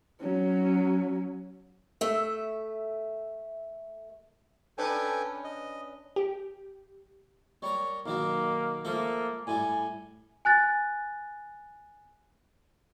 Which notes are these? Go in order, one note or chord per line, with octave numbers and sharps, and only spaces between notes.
F#3 C#4
A3 E5
C#4 D4 A4 B4 G5 G#5
D#5
G4
G3 A#4 C#5
B1 D#3 F#3 A#3
F3 A3 A#3 A4
A2 G3 G#5
G#5 F#6 A6